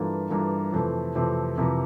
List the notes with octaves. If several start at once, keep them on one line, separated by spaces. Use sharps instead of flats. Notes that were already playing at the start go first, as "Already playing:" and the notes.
Already playing: G2 E3 A#3 F4 A4
G2 E3 A#3 F4 A4
F2 C3 E3 A3 C4
F2 C3 E3 A3 C4
F2 C3 E3 A#3